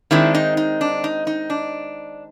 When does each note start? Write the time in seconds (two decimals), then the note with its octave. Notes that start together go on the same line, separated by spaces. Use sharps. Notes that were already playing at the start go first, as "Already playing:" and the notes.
0.11 D#3 G#3 C4 D4 E4
0.34 D#4
0.57 D#4
0.81 D4
1.04 D#4
1.27 D#4
1.50 D4